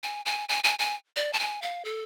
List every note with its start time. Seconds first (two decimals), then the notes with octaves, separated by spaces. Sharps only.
0.03 G#5
0.26 G#5
0.49 G#5
0.64 G#5
0.79 G#5
1.16 D5
1.33 A5
1.39 G#5
1.62 F5
1.85 A4